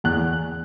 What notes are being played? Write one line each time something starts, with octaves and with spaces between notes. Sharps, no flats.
E2 F#6